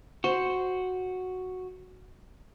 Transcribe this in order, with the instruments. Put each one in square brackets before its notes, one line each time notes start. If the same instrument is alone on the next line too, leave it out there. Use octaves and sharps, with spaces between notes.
[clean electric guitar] F#4 [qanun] C5